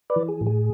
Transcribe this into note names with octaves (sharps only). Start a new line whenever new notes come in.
B4 D5
E3
G#4
A2
G#4